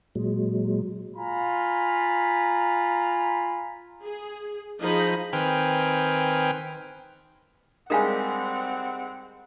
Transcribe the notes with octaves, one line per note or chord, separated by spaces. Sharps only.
A#2 F#3 G#3
F4 G#5 A#5 B5
G#4
F3 D#4 G#4 D#5 B5
D#3 C4 B4 G5 G#5 F6
G3 G#3 C4 D#4 A#4 F5 F#5 G#5